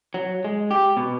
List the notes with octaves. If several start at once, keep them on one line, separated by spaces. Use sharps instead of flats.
F#3
G#3
G4
B2